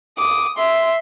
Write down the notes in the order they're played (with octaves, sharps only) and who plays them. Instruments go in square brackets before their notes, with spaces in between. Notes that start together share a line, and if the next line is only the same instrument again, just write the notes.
[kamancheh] D6 [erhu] D#6
[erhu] E5 [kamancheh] C6